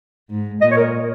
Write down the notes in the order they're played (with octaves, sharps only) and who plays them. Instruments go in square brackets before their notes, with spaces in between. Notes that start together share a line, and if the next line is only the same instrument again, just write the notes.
[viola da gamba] G#2
[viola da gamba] A#2 [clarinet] D#5
[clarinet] C#5
A#4